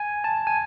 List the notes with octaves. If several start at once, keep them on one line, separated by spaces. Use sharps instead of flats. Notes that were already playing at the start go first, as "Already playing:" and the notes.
Already playing: G#5
A5
G#5